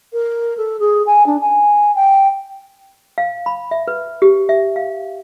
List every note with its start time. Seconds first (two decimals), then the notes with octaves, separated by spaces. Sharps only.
0.12 A#4
0.57 A4
0.79 G#4
1.06 G#5
1.26 D4
1.41 G#5
1.95 G5
3.18 F5
3.46 B5
3.71 E5
3.88 B4
4.22 G4
4.49 E5
4.76 F5